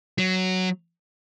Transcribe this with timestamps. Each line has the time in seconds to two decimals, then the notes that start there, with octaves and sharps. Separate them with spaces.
0.18 F#3